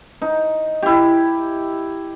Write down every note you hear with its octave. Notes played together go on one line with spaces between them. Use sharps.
D#4
E4 G4